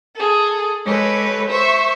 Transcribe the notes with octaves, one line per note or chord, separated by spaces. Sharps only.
G#4 A4
G#3 G4 A4 B4 C#5
C5 E5 C#6